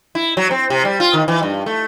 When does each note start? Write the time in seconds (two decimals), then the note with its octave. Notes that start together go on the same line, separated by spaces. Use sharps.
0.15 E4
0.37 F#3
0.51 C4
0.70 C3
0.85 G3
1.00 F4
1.14 D#3
1.28 E3
1.43 G2
1.66 A3